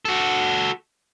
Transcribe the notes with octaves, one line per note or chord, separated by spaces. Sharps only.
F#4 A4